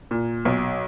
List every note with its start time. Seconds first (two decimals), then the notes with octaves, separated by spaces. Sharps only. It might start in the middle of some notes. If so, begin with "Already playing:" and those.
0.11 A#2
0.45 B1